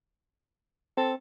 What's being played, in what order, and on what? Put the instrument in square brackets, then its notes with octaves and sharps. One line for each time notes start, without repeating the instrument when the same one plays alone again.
[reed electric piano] C4 [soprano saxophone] A4